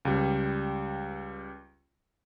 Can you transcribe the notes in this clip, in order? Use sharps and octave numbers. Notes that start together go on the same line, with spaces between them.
C#2 G3